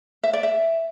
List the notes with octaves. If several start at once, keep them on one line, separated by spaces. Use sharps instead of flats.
E5
D5
E5